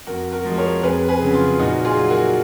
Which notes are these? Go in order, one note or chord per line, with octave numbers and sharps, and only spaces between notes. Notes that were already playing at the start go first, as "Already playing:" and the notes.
F2 F#4 A#4
F#4 A#4
F3 G#3
A#4 C#5
F2 G#4 B4
G#4 B4
C#3 F#3
F4
A#2 D#4 F#4
F4 G#4
F#3
F#4 A#4